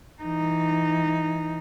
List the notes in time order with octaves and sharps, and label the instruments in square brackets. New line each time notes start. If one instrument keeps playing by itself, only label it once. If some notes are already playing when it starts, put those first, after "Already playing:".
[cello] E3 D#4